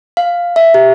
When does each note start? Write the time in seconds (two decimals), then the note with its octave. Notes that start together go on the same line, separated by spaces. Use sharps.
0.17 F5
0.56 E5
0.74 G4